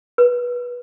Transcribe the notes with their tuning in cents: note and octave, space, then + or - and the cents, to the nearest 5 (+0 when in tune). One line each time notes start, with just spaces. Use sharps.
B4 -20